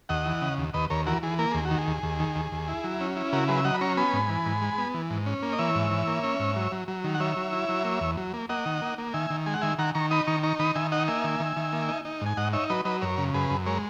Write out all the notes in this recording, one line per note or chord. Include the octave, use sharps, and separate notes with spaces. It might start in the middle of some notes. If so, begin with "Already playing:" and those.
D#2 D#5 F#5
E3
C#3
D#2
D#2 B4 D#5
D#2 A#4 C#5
E3 F#4 A#4
E3 G#4
A#3 A#4
D#2 G#4
F#4
D#3
G#4
D#2
D#2
D#3
D#2
D#2
E4
F#3
C#4
E4
C#3 F#4 A#4
F#3 G#4 B4
E5
F#3 D#5 F#5
B5
C#4 A#5 C#6
B3 G#5 B5
G#2
E3
G#2
G#3
B3
E3
G#2
C#4
A#3
D#5
E3 C#5 E5
G#2
E3
A#3
C#4
G#2
F#3
F#3
F#3
D#3
F#5
F#3 C#5 E5
F#3
E4
F#3
A#3
E2
F#3
A#3
A#3 D#5 F#5
D#3
A#3
A#3
D#3 E5 G#5
D#3
G#3 G#5
F#5
D#3 E5 G#5
D#3 F#5 A#5
D#3 A#5 C#6
D#4 B5 D#6
D#3 A#5 C#6
D#4 A#5 C#6
D#3 B5 D#6
D#3 E5 G#5
D#4 D#5 F#5
A#3 E5 G#5
D#3
D#3
D#3
A#3
D#4
D#4
G#2 G#5
G#2 D#5 F#5
D#4 C#5 E5
F#3 B4 D#5
F#3 B4 D#5
F#2 A#4 C#5
C#3
F#2 G#4 B4
F#2
G#3 A#4 C#5